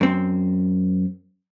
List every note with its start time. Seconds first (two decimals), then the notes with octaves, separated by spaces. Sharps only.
0.01 F#2 C4